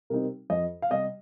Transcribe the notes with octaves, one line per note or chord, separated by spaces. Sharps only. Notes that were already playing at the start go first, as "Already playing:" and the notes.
C3 G3 C4 D#4 A#4
F2 D#5
F5
C3 G3 D#5